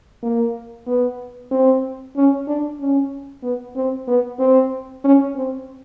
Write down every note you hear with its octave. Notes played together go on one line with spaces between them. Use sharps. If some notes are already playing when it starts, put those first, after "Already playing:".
A#3
B3
C4
C#4
D4
C#4
B3
C4
B3
C4
C#4
C4